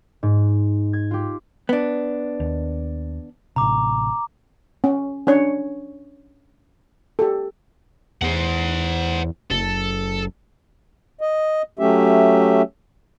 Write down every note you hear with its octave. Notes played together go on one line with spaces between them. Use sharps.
G#2
G#6
F4 G4
B3 D4
D#2
A1 C3 A#5 D6
C#4
C#4 D4 C#5
G4 A4
E2 C5 F#5
F#1 A4
D#5
F#3 A3 C#4 G4 E5